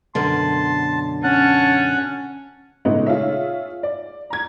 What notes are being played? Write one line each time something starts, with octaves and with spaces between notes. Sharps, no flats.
F#2 B2 D3 A5 C6
C#4 F#5 A5
A#2 C#3 G#3 A3 B3 D#4
F4 G#4 C#5 E5
D5
A#5 G#6